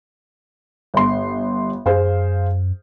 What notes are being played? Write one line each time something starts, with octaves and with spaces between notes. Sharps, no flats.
G1 C6
F#2 G#4 C5 F5